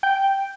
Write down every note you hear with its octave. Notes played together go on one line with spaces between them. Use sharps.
G5